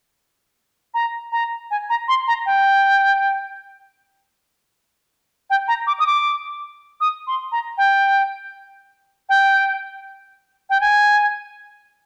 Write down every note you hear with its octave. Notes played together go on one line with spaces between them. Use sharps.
A#5
A#5
G#5
A#5
C6
A#5
G5
G5
A#5
D6
D#6
D6
D#6
C6
A#5
G5
G5
G5
G#5